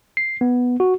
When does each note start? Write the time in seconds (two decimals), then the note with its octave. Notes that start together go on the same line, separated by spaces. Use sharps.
0.17 C7
0.41 B3
0.80 F#4